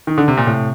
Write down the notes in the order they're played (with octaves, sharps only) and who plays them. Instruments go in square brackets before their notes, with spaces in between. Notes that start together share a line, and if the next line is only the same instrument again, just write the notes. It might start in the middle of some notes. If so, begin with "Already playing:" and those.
[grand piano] D#3
D3
C3
A#2
[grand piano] A2 [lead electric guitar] C3